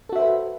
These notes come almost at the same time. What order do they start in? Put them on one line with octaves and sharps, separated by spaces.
A4 F#4 E5 C5 B4